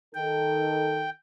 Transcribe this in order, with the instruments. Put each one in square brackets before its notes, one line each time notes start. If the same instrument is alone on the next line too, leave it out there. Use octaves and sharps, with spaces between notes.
[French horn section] D#3 A4 [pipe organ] G5